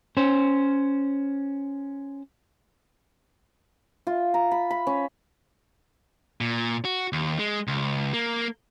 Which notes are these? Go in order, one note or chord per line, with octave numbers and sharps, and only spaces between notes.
C#4 C5
F4
A#5
B5
B5
C#4
A#2
F#4
D#2
G#3
C#2
A#3